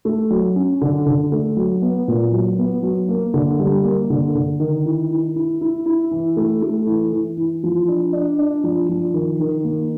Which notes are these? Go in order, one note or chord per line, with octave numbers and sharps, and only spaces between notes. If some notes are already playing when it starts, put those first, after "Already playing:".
A3
F#3
C#4
D3
D3
A3
F#3
B3
A#2
F#3
B3
F#3
A#3
D3
G3
A#3
D3
D3
D#3
E4
E4
E4
E4
E4
E3
A3
A3
E3
E3
E3
F3
D4
D4
D4
F3
F3
D#3
D#3
A#3